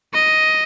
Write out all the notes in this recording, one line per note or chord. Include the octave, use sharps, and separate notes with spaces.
D#5